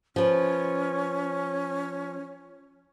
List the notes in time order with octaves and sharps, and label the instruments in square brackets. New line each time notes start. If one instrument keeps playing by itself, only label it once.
[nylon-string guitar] F3 B4 [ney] C#4